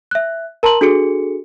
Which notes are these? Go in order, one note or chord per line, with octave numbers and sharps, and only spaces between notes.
E5 F#6
A#4 A5 A#5 C6 F#7
D4 F#4 G#4 A4 C#7